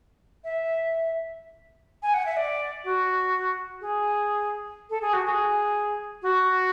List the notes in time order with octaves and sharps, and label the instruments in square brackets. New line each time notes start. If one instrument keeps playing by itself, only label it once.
[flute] E5
G#5
F#5
E5
D5
F#4
G#4
A4
G#4
F#4
G#4
F#4